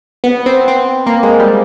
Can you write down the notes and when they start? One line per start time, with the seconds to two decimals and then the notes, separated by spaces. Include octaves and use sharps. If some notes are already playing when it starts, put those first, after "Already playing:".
0.24 B3
0.46 C4
0.68 C4
1.06 A#3
1.23 G#3
1.40 G3